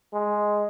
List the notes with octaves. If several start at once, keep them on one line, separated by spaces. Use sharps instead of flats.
G#3